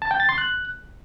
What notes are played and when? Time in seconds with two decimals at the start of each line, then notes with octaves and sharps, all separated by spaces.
0.02 A5
0.11 G5
0.20 A6
0.29 C6
0.38 F#6